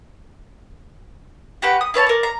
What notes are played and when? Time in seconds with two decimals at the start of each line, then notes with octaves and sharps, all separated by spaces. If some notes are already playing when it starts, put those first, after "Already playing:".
1.62 F#4 G4 B4 F#5
1.81 D#6
1.94 E4 B4 C#5 A5
2.06 A#4 D5
2.23 A#5